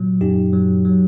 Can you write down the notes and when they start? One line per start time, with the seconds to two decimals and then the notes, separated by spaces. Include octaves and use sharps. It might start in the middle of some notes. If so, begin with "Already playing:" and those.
Already playing: A#2 F#3
0.21 F#2 D#4 G4
0.53 F#3
0.85 F#3